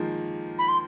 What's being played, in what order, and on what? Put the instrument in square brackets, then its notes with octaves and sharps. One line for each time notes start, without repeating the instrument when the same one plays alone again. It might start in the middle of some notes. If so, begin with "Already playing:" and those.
Already playing: [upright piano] D#3 F3 G#3 A#3
[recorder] B5
C6